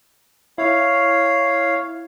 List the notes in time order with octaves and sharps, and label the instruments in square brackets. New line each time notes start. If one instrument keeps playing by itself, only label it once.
[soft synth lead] E4 [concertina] C#5 F5